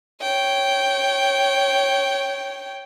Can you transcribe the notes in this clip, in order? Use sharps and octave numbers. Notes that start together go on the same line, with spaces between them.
C#5 G5